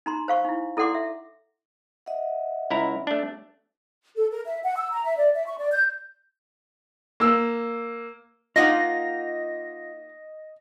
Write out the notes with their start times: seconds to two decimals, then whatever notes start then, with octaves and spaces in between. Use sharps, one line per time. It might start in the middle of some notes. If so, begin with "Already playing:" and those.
0.06 D#4 A#5 C6
0.28 C5 F5 C#6
0.45 D#4 E4
0.77 E4 A4 D5 F#5 C6 D6
0.94 E5
2.06 D#5 E5 F#5
2.70 C#2 E4 A#5
3.07 A3 D4
4.17 A4
4.32 A#4
4.45 E5
4.63 F#5
4.77 E6
4.91 A#5
5.04 E5
5.17 D5
5.34 E5
5.47 C#6
5.59 D5
5.72 G6
7.20 A#3 E6
8.56 A#3 D#4 F4 D#5 F5 F#5 A#6